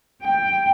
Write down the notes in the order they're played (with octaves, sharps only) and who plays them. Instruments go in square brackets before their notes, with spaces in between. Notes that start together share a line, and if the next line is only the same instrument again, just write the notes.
[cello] G5